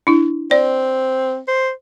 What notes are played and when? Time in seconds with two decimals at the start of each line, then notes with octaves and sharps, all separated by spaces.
0.07 D4 E4
0.51 C4 D5
1.48 C5